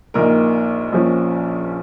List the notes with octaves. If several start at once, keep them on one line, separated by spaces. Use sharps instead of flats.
A#1 A#2 A#3 D#4 A#4
A#1 A#2 F3 C#4